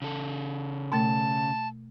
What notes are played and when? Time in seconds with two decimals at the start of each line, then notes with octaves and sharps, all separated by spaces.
0.02 C#3 A4
0.92 B2 A3 A5